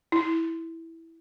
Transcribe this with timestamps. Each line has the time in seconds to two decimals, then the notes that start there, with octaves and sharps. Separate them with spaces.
0.12 E4